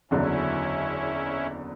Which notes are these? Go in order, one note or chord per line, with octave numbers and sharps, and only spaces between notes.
F#1 E2 D3 F#3 C#4 E4